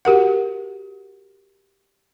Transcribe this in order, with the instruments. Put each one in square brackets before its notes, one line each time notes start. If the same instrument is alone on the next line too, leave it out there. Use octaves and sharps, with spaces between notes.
[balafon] F#4 G4 A#4 F#5